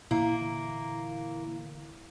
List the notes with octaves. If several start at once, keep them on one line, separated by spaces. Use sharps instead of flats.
A#2 D3 E3 A#3 E4